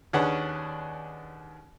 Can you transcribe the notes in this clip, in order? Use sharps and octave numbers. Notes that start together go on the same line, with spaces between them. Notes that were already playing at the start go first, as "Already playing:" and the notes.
D#2 C#4 D4 G#4 B4 F#5